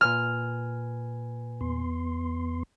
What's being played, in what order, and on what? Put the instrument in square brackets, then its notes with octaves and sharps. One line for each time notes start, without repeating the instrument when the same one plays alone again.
[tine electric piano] A#2 B4 G#5 [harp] F6
[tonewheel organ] E2 B3 C6